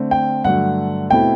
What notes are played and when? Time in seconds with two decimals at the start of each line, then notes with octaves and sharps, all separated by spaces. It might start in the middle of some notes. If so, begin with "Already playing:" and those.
Already playing: D3 A3 C4
0.11 G5
0.44 G2 D3 F#3 A3 F#5
1.10 B2 A3 C4 E4 G5